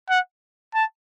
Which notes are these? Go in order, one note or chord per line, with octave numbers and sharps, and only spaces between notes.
F#5
A5